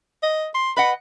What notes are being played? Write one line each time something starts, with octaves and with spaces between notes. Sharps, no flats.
D#5
C6
B4 D#5 F#5 B5